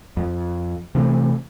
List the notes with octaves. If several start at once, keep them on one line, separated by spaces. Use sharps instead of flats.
F2
C3 E3 A3